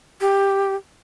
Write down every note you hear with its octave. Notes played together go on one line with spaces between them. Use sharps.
G4